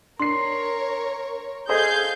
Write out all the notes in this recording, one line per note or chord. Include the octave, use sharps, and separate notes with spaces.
D4 A#4 C#5 C6 C7
G#4 A4 C5 D#5 F5 G6